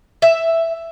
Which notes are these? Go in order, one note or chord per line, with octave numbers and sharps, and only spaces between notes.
E5